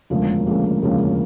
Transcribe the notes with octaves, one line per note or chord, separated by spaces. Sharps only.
E1 D2 C#3 F3 A#3
E1 D2 C#3 F3 A#3
E1 D2 C#3 F3 A#3